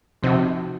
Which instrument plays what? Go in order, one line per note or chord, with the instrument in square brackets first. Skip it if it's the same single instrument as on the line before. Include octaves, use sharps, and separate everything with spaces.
[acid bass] C3 [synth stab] F3 C4 D#4 F#4